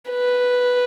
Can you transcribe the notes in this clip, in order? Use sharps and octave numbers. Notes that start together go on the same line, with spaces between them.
B4